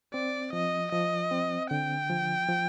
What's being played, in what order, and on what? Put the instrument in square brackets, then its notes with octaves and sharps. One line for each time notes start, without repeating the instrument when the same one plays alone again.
[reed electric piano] C4 [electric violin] D5
[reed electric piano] F3 [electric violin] D#5
[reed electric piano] F3 [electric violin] D#5
[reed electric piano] C4
[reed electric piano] D3 [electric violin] G5
[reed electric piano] F3
F3